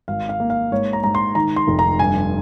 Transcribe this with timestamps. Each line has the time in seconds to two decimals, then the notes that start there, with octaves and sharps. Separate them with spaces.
0.08 G#1 F5
0.29 F5
0.40 A#3
0.50 F5
0.72 G#2 C#5
0.93 A#5
1.04 G#2 A#5
1.15 C6
1.35 D#3 A#5
1.56 C6
1.67 F1
1.79 A#5
1.99 G2 G#5